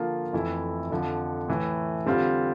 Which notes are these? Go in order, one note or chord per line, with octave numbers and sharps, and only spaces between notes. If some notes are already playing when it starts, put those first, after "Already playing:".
Already playing: D3 F3 A#3 F4
F2 E3 A3 E4
F2 D3 F3
A2 E3 A3
D3 G3 C4 F4